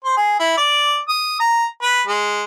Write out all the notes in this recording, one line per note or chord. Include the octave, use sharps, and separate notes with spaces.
C5
G#4
E4
D5
D#6
A#5
B4
G#3